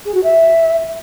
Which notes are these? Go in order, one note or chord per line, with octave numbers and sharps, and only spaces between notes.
G#4
F#4
E5